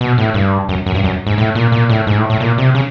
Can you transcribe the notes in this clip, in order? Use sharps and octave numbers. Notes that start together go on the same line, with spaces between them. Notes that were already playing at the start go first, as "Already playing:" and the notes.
B2
A2
G2
F#2
F#2
G2
F#2
G#2
A2
A#2
A#2
A2
G#2
A2
A2
A#2
C3
C#3